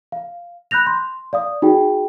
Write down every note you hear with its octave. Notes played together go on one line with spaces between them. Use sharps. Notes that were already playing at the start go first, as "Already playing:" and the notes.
F5
B5 F#6 G6 A#6 F7
C6
D5 F5 D#6
D#4 F#4 G#4 G5